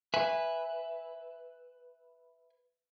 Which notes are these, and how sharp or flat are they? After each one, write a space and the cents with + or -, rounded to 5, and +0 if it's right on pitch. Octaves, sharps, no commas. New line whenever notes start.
B4 +0 E5 +0 G#5 -10